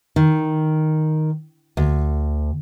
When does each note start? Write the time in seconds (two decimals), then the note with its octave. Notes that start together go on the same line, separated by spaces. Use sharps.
0.16 D#3
1.77 D2